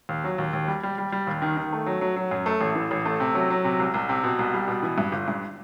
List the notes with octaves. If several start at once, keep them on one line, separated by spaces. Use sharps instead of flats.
D#2
F#3
D#2
D#2
G3
G3
G3
G3
D#2
D#3
D#3
A3
F#3
F#3
F#3
F#2
A3
A1
E3
A1
A3
C3
F#3
F#3
C3
C2
C2
C3
B2
C2
G3
B2
E3
G2
G1
G2